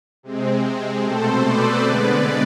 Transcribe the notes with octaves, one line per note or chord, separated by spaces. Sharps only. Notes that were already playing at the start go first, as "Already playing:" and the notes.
C3 G#3 C4
B2 A3 C4 A4 C5
B4 D5
D3 G#3 B3